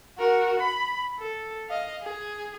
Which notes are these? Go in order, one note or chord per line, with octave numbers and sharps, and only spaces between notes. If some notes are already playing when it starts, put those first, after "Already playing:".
F#4 A#4
B5
A4
D#5 F5
G#4